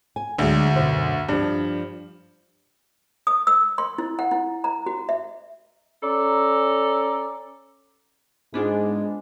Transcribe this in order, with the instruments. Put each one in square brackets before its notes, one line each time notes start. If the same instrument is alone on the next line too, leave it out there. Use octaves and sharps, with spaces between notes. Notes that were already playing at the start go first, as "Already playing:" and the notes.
[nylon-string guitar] G#5
[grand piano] D2 [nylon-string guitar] F#3 G#3 D4
[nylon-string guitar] F#2 B2 C5
[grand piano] G2 [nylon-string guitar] F3 D4
[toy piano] D#6
E6
C6
E4
F#5
E4
A#5
F#4
E5
[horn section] C#4 A4 D5 A#5
[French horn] G#2 [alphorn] G#3 [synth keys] B3 D4 F4 [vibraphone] G#4